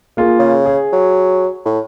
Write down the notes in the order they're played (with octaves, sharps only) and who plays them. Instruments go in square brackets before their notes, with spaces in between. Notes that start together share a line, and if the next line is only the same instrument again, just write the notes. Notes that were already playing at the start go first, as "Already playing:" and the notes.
[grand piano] A#3 F4 G#4
[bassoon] C#3
[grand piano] G#4
[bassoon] F#3
A2